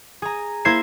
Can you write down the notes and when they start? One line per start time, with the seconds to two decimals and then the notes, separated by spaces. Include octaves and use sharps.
0.22 G#4 A#5
0.65 A#3 E4 C5 G#6 C7 E7